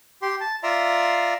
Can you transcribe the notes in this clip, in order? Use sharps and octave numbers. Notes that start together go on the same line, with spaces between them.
G4 C6
A5
F4 D5 E5 A#5 C6